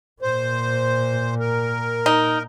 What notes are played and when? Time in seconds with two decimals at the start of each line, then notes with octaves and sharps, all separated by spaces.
0.22 A#2 C5
1.40 A#4
2.06 D#4